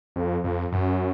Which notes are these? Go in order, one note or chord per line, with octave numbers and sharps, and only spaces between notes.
F2
F2
F#2